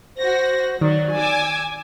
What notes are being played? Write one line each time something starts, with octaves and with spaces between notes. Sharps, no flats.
F#4 C5 A#6
D#3 F#3 D5
G#5 D6 E6